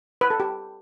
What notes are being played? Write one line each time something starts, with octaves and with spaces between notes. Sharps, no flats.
B4
A4
G4